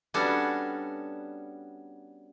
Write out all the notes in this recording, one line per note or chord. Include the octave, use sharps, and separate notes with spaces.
G3 B3 C#4 D4 F#4 A4